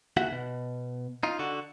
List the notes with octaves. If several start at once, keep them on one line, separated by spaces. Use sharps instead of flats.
D#2 F#4 E5 F#5
B2
D#4 F4
D3 F#4